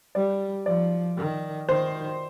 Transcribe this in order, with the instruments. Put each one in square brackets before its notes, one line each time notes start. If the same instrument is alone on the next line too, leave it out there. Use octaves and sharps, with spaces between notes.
[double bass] G3 [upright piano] D5
[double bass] F3 [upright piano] D5
[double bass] D#3
[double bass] D#3 [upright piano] C5